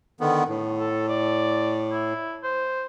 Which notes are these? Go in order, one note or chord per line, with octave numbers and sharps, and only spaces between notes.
D3 D#3 B3
A2
A4
D5
E4
C5